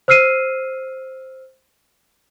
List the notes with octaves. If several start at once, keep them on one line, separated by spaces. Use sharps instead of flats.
C5 E6 F6 C7 D#7